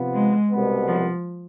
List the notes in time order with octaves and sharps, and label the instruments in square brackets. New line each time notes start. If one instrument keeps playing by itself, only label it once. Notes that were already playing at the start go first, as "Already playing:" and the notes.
Already playing: [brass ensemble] C3 F3 B3
[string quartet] G#3
[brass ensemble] C2 B2 B3
[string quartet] F3